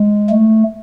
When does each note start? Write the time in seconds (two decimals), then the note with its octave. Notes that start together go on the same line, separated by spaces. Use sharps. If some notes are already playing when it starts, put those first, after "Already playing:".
Already playing: G#3
0.30 A3